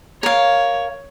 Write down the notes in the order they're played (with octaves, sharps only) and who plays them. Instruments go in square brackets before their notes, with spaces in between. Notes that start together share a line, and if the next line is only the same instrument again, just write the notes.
[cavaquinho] A#4 F5 [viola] C#5